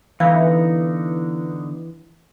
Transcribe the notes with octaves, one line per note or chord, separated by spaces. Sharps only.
D3 E3 B3 D#4 F5